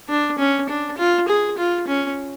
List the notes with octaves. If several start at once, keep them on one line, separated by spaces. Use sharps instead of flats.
D4
C#4
D4
F4
G#4
F4
C#4